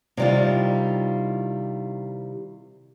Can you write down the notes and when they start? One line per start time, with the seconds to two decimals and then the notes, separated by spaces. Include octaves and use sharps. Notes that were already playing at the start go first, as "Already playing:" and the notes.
0.17 C3 D#3 G3 E4 F4